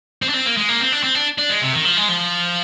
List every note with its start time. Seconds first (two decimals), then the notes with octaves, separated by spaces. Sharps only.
0.22 C4
0.29 D4
0.34 C4
0.46 A#3
0.57 G#3
0.69 A#3
0.80 C4
0.92 D4
1.03 C4
1.15 D4
1.38 D4
1.50 G#3
1.61 C3
1.73 D#3
1.85 F3
1.97 G#3
2.09 F3